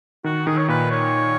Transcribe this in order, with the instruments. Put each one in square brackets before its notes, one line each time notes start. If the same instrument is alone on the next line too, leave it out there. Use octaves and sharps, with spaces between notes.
[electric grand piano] D#3 [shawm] F#4
[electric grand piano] D#3 [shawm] G#4
[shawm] C#5
[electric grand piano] A#2 [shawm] B4
[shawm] C#5